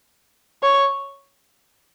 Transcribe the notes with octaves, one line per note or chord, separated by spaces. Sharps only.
C#5